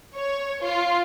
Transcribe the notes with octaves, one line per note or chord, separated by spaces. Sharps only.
C#5
F4